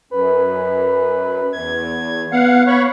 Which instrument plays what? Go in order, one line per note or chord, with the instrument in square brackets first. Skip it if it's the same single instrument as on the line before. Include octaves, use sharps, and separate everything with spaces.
[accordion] F#2 [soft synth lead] B4
[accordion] E2 [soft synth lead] G#6
[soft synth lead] B3 [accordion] F5 F#5
[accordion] C#5 B5 C#6